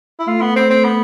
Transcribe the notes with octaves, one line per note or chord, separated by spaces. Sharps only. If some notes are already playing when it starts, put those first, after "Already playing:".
E4
A3 F4
B3
C4
C4
B3